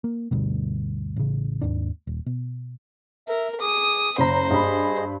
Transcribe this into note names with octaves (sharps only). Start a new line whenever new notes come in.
A#3
D2 G2 B2
A1 C#3
D#2 G#2 D4
D#1
B2
A#4 E5
G#4 D6 D#6
F#1 C5 A#5 B5
G2 G#4 D#5 B5